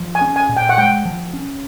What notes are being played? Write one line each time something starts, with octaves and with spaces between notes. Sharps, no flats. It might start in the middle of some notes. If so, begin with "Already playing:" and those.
Already playing: F3
G#5
C#4
G#5
A#2
G5
F#5
G#3 G5
F3
C#4